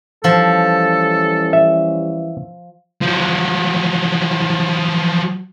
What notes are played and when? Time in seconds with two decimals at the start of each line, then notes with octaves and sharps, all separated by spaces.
0.24 E3 F3 G3 C#4 A4
1.53 E5
3.02 F3 F#3